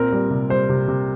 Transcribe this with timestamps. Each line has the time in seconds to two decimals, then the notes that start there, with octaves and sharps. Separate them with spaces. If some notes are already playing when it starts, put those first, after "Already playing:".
Already playing: A#2 C4 A#4
0.13 G3
0.30 C3
0.50 G3 C5
0.69 C3
0.88 C3